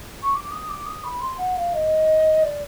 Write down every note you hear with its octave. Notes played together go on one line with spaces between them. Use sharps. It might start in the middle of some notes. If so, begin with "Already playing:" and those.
C#6
D6
D#6
D6
D#6
B5
C6
F#5
F5
D#5
D5